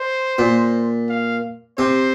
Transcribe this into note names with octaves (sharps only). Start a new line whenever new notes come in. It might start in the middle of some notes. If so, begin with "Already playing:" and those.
Already playing: C5
A#2
F5
C3 C5